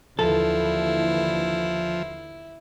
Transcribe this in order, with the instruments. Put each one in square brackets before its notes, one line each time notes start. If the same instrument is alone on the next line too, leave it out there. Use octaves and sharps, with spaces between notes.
[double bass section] D#2 D3 E3 [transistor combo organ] F3 [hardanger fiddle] E4 [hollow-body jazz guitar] A4